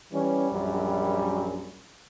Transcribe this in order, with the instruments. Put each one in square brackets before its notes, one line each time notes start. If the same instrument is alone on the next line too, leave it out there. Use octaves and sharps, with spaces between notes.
[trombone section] E3 C#4 [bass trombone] G3
[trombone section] A#1 F#2